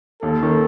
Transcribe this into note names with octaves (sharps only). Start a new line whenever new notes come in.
D#2 A4
D#3